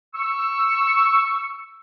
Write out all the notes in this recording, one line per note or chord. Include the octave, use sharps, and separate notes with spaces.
C#6 E6